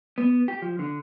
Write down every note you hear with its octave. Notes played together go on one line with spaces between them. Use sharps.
B3
G4
F3
D3